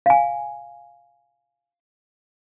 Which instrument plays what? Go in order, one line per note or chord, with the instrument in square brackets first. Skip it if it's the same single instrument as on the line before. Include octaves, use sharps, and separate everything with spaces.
[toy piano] F5 G#5